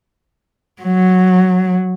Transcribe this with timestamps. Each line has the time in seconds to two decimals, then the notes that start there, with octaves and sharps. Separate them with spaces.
0.82 F#3